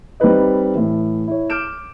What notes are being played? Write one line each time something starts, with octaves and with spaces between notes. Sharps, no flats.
G3 C4 D#4 B4 D#5
A2 E3
E4 C#5
D6 F6 G6 D7 E7